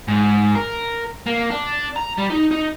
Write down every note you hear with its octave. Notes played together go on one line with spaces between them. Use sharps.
G#2
A#4
A#3
D4
A#5
G3
D#4
D#4